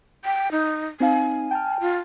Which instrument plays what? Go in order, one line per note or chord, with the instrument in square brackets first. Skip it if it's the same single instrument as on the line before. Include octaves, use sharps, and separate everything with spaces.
[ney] G5
D#4
[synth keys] C4 D#4 F5 [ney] G#5
[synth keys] G5 A5 F6
[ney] F4